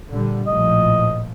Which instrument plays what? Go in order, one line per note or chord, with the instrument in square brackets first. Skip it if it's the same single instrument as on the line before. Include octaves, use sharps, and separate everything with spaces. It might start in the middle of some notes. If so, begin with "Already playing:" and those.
[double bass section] A#2 D3 G3
[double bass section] A#1 A2 F3 [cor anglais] D#5